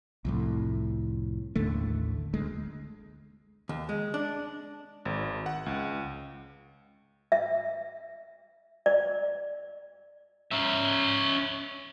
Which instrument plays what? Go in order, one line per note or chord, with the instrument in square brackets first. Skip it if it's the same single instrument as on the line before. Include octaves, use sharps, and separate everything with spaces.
[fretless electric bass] C2 F2 A2
A1 D#2 D3 A3
D2 G#3
[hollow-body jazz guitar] D#2
G#3
D4
[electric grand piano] G#1
F#5
C#2
[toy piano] E5
D5
[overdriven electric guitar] C#4 E5